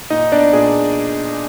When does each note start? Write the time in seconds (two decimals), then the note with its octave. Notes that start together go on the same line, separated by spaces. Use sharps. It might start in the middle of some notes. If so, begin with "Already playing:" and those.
0.10 A#2 D#4 D#5
0.32 B3 D4 D5
0.53 A#2 G#4